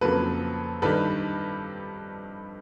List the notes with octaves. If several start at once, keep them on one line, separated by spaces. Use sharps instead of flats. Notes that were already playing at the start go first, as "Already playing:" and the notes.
F2 C#3 F#3 A#3 A4 B4
G2 D#3 G3 A4 B4